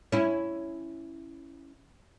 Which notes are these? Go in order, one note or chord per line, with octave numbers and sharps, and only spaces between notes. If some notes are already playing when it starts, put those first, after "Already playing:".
C#4 E4